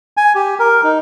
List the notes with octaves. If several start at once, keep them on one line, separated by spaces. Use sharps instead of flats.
G#5
G4
A#4
D#4